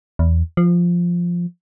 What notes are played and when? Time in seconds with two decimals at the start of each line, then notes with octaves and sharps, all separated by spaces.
0.19 E2
0.57 F3